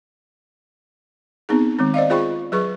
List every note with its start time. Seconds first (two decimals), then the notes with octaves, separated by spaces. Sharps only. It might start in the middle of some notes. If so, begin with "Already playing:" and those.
1.49 B3 C4 D#4 G#4
1.79 D#3 G#3 C4
1.94 C5 D5 D#5 F5
2.10 F4 G#4 C5 G5 B5 C#6
2.52 F#3 G#4 B4 C#6